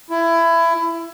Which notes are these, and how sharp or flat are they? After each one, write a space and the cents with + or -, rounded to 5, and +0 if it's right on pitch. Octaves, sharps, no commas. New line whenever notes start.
E4 +20